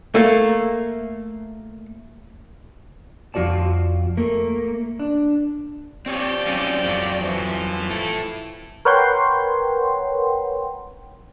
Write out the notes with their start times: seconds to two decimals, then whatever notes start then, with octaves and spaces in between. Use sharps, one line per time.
0.15 A3 A#3
3.34 F2 F4 F#4 D5 A5
4.17 A3 A#3
5.00 D4
6.06 F3 C4 G4 C#5 D5
6.47 F#3 C4 C#4
6.84 F2 F#3
7.20 E3 F3
7.90 E4 A4
8.85 A#4 B4 C#5 F#5 G5 C6